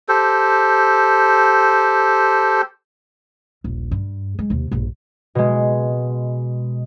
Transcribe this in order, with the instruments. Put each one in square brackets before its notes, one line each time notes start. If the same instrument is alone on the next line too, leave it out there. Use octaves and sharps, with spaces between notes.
[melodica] G4 A4 C5
[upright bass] D#1 A#1
G2
G#3
D#2 C3
A#1 G2
[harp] B2 G#3